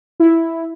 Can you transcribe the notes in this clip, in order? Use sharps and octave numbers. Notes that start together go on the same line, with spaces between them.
E4